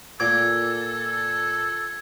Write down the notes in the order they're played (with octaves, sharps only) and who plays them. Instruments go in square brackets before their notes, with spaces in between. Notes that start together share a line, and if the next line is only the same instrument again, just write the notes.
[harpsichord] A#2 D6 [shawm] A4 [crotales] G#6